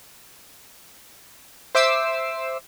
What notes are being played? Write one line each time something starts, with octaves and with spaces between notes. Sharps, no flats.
C5 E5 D6 E6 C7